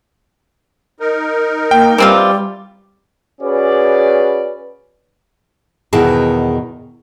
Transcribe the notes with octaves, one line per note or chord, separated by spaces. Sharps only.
D#4 A#4
A#3 G5
E3 G3 C4 F4
C#4 F#4 G#4 B4 D5
E2 B2 D#3 E4 G#4 A5